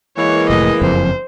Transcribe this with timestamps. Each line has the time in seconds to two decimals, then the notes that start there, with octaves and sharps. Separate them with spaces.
0.18 E3 G#3 A#3 C#5
0.50 F1 A2 D#5
0.82 F#1 F2 C5